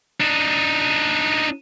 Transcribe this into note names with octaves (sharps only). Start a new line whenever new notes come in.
D4 D#4